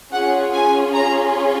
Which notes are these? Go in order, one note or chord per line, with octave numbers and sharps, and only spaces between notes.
C#4 F4 G#4 F#5
G#5
A#5